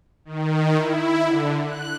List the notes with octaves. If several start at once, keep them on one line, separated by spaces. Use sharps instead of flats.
D#3
E4
D3
F#6